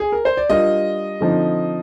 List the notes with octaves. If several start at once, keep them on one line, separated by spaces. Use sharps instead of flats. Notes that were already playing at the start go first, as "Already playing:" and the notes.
G#4
A#4
C5
D5
G3 D4 F4 A#4 D#5
D3 F3 C4 D#4